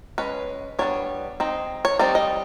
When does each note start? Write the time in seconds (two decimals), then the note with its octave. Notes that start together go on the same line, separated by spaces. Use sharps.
0.18 G#3 C#4 B4
0.79 G3 B3 D4 C#5
1.40 G#3 C4 D#4
1.85 C#5
1.99 G3 C4 D#4 D5
2.15 D#5